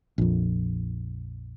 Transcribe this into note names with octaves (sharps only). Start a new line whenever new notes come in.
A#1 F2